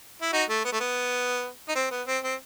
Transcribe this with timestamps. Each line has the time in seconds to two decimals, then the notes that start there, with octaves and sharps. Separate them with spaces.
0.22 E4
0.33 D#4 F#4
0.49 A3
0.64 B3
0.72 A3
0.80 B3
1.68 D#4
1.75 C4
1.91 B3
2.07 C4
2.24 C4